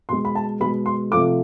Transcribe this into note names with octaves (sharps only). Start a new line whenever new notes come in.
B2 G#3 C6
B5
A5
B2 G#3 B5
C6
C3 F3 A3 D6